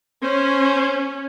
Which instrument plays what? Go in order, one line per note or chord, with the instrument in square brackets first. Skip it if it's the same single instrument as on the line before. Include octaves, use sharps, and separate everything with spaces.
[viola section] C#4 [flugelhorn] C5